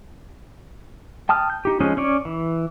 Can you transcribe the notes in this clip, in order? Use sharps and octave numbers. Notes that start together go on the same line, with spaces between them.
G5 A5 D#6 F6
G6
D#4 G4
F3 G#3 C4 C#4 D#4
C#4 C#5 D5
E3